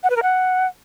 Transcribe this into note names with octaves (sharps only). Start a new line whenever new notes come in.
F#5
B4
A#4
F#5